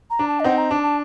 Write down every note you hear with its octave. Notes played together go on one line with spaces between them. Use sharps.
A#5
D4
A5
D#5
C4 D#4 F#5
A#5
D4 A5
A5